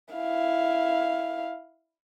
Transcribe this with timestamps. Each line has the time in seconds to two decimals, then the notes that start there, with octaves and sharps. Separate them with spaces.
0.15 E4 F5